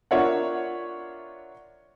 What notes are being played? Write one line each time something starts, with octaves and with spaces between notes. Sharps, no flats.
D4 F4 A#4 C#5 E5 F#5